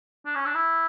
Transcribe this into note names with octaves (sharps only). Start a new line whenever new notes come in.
D4
C#4
D4
E4